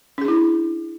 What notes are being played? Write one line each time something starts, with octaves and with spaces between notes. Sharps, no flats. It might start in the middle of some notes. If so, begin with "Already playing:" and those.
C#4 D4 E4 G#4